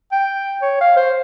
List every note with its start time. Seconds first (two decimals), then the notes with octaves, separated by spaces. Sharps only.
0.12 G5
0.62 C#5
0.81 F5
0.97 C5